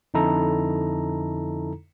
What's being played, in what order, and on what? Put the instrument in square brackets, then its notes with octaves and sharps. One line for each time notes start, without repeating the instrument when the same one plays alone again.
[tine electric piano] F2 D3 D#4 E4 A4 A#5